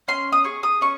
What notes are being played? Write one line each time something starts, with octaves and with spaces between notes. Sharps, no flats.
C#4 C6
D#6
G#4 C#6
D#6
C#4 C#6